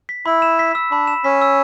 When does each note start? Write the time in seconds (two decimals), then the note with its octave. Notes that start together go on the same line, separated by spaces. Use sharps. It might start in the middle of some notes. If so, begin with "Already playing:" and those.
0.09 B6
0.26 E4 B5
0.42 E7
0.59 B6
0.75 E6
0.91 D4 B5
1.07 E7
1.24 C#4 B6
1.41 E6